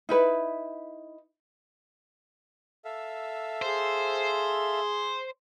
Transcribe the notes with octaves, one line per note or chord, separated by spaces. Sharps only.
D#4 E4 B4
A4 E5 F5
G#4 C5